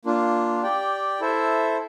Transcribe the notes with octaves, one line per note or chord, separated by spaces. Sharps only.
A#3 D4 F4
G4 D5 G5
E4 A4 C5 E5